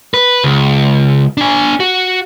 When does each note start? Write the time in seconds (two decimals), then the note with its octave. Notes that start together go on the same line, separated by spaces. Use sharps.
0.14 B4
0.44 C#2
1.37 D4 G#5
1.80 F#4